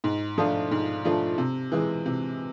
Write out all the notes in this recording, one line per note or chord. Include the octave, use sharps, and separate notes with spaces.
G#2
F3 A3 D4 F4
G#2
F3 A3 D4 F4
C3
E3 G#3
C3